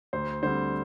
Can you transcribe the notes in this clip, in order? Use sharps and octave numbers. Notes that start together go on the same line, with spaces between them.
D2 C5
D3 G3 C4 C5